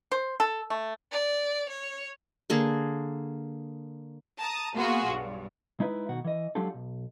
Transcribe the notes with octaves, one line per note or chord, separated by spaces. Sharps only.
C5
A4
A3
D5
C#5
D3 A#3 G#4
A5 A#5 D#6
A#3 B3 F4 F#4 G#4
B1 G2
G#3 D#4 E4 B4
B1 B2 D#3 F#4 F#5
E3 D#5
F#3 G#3 D4 F4 G4 A4
B1